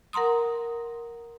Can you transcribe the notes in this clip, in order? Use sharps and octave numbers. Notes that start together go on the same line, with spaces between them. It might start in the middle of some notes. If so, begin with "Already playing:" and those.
A#4 F#5 A#5 C6 D#6